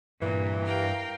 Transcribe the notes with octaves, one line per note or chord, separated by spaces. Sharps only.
G2 A#2 E3
A#4 F5 G5